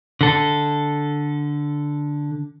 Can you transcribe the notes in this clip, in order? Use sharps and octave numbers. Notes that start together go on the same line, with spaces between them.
D3 A4